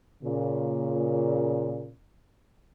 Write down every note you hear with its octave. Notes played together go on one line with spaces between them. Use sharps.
A#2 C#3